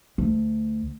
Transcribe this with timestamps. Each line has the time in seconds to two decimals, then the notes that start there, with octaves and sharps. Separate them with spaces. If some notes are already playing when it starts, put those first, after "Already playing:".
0.18 D2